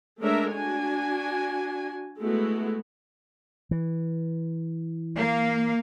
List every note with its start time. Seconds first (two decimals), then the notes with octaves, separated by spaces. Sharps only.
0.21 G#3 A3 D4 A#4 C#5 E5
0.53 D4 F#4 G#5
2.20 G#3 A3 B3 E4 F#4
3.71 E3
5.15 A#3 F5